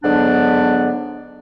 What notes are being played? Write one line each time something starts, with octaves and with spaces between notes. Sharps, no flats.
G#2 D3 F#3 B3 D4